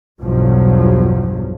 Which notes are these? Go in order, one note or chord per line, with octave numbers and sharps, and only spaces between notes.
B1 E2 G2 B2 F3 F#3